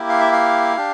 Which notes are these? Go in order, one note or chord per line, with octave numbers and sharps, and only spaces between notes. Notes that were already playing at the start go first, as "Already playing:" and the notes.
Already playing: A#3 E4 G4
F5
E5
F5
D4 G4